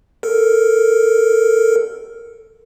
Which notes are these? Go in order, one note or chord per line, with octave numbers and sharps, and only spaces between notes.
A4 A#4